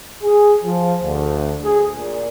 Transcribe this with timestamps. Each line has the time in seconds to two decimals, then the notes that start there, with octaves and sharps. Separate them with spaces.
0.23 G#4
0.64 F3
1.02 D2
1.63 G#4
1.98 A#2